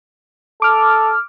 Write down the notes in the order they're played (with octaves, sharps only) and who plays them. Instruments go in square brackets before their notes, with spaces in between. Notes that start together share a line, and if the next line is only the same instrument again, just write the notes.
[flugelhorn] A4 [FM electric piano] D6 F6